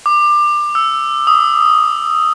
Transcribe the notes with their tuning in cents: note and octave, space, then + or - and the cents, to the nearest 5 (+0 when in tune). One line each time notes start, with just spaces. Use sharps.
D6 +20
E6 +10
D#6 +0